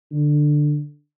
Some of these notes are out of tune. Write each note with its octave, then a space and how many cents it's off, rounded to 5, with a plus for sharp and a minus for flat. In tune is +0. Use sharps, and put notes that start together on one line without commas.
D3 +10